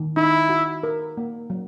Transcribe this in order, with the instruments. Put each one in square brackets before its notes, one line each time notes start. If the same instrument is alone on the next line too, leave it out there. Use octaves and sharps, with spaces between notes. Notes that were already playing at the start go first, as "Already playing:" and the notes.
Already playing: [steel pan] D#3
[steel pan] D#4 [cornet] E4
[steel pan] F#4
A#4
A#3
F#3